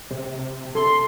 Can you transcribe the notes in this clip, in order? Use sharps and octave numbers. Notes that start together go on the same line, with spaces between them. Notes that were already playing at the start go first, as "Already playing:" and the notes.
C3
A4 C6